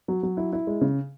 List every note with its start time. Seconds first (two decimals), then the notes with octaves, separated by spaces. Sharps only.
0.08 F#3
0.23 F#3
0.37 E4
0.53 E4
0.67 G#3
0.81 C#3